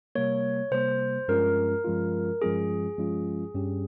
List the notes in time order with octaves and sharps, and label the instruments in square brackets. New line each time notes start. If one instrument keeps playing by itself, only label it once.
[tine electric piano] C3 G3 A#3 [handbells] C#5
[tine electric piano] C3 G3 A#3 [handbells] C5
[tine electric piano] G2 F3 G#3 C#4 F4 [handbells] A#4
[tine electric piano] G2 F3 G#3 C#4 F4
[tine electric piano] G2 F3 G#3 C#4 F4 [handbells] G#4
[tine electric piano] G2 F3 G#3 C#4 F4
G2 G3 C#4 G4